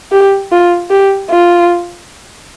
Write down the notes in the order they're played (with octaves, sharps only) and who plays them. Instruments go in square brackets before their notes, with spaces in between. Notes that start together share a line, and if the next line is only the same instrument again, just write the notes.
[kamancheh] G4
F4
G4
F4